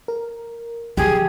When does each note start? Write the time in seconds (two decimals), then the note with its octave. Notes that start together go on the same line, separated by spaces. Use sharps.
0.08 A#4
0.97 D3 F3 F#3 G4 G#4